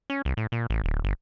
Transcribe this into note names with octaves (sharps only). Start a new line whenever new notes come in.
C#4
C2
A2
A#2
A1
D1
G1